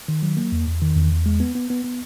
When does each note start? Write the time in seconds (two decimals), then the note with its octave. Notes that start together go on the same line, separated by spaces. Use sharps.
0.08 D#3
0.22 F#3
0.37 A#3
0.52 E2
0.67 E2
0.82 D#3
0.96 E2
1.11 E2
1.26 G#3
1.40 B3
1.55 B3
1.70 B3
1.84 B3